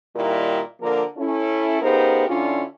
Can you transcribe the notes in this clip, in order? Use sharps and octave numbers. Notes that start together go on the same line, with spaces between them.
A#2 D#3 G3 E4 A#4
D3 F3 A#3 A#4
C#4 E4 A4
C#3 B3 D#4 G4 A#4 C5
D3 C#4 D4 E4 F4